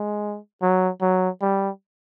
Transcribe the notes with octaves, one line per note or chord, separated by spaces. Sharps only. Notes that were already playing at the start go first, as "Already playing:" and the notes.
Already playing: G#3
F#3
F#3
G3